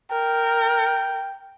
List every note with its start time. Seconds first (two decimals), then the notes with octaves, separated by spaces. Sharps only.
0.11 A#4 G5